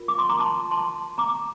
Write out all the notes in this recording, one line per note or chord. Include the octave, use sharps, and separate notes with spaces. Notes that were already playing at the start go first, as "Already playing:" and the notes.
Already playing: F4 A#4
D6
C6
A#5 D6
A5 C6
A5 C6
A#5 D6